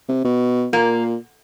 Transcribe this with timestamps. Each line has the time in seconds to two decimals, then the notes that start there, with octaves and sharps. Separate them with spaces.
0.08 C3
0.24 B2
0.72 A#2 A#3